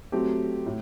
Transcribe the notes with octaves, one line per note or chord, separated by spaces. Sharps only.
F#3 A3 C4 G4
A2